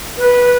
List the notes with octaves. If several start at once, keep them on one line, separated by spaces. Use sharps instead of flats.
B4